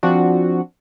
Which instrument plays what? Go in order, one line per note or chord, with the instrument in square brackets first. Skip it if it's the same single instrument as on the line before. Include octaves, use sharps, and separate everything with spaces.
[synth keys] F3 C4 D4 F#4